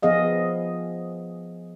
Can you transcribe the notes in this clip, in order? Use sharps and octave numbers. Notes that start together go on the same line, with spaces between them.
F3 B3 G#4 D#5 F5